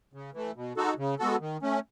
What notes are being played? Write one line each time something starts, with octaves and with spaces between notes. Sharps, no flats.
C#3
E3 A3
B2
G#3 D#4 F#4 A4
C#3
G#3 B3 F#4 A4
D#3
A3 C#4